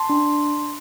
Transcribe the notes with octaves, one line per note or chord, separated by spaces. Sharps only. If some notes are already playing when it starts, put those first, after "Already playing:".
Already playing: A5 C6
D4